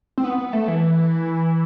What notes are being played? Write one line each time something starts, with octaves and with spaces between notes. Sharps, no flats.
C4
B3
B3
A3
E3